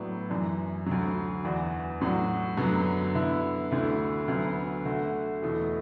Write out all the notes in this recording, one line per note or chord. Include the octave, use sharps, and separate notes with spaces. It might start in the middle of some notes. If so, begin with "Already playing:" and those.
Already playing: A2 F#3 B3 D4
F#2 E3 D4
D2 D3 F#3
E2 E3 D4 F#4
A2 F#3 D4 F#4
F#2 D3 F#3 B3
D3 B3 E4
D2 D3 A3 E4
D2 D3 F#3 B3
D3 A3 F#4
E2 B2 A3 E4